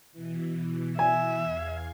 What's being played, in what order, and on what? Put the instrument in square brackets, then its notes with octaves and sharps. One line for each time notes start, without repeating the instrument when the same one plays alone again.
[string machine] B2 E3
[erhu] E5 [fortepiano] G#5
[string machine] E2 F5 G#6